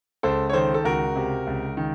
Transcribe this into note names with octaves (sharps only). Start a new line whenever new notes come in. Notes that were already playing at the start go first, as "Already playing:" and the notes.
C#2 A4 C5
C#5
D#3 A4 C5
A4
C#2 F#4 A#4
C3
C#2
D#3